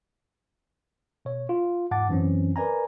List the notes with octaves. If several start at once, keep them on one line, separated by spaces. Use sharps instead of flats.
B2 C#5
F4
E2 G#2 F#5 A5 D6 A6
F#2 E3 F#3 C4 C#4
A#4 B4 D5 G#5 A#5